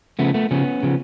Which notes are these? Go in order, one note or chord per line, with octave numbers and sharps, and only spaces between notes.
C#3 F3 A3 B3
A3 B3
C#3 F3 B3 C#4
C#3 F3